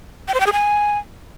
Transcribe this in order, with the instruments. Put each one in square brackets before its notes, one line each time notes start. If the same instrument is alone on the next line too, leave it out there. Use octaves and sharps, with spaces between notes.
[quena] G5
C5
G5
G#4
G#5